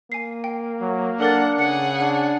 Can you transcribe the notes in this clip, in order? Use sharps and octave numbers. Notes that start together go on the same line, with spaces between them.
A#3 G#5 C7
G5
F#3
D4 A4 A#4 F#5 A6
C#3 G#4 F#5 C#7
D4